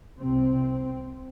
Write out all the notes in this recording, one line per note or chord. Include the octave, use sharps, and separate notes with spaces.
C2 C3 C4